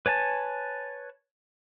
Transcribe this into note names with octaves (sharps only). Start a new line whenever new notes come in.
B4 C#5 G#5 A5